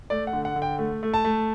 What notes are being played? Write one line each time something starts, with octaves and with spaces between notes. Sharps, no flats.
A3 D5
F#5
D3
F#5
D3
G5
A3
A3
A5
A3